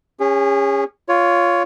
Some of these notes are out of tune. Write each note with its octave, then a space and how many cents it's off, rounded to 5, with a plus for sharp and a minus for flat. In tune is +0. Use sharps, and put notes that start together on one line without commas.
C#4 +0 G#4 -35
F4 +0 C#5 +15